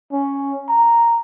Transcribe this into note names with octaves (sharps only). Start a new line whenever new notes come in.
C#4
A#5